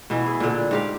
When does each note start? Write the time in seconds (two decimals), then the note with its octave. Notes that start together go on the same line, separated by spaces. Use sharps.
0.10 B2 E3 E4
0.26 E4 G#4
0.40 A#2 D3
0.71 G#2 G4 F5